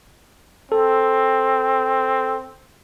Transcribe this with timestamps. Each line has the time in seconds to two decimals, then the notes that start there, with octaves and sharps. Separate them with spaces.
0.72 C4 A4